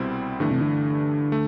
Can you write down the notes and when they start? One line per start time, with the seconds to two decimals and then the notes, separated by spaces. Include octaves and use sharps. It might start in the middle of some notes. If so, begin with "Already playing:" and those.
Already playing: C2 B2 G3 C4 E4
0.40 G2 D3 E3 A3
0.51 C3
0.61 D3
1.32 A3